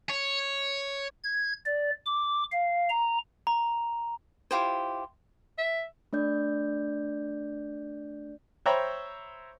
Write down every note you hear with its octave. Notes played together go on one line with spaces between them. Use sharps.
C#5
G#6
D5
D6
F5
A#5
A#5
E4 F4 G4 C5
E5
A3 D4 D5 G6
C5 C#5 E5 G5 A#5 B5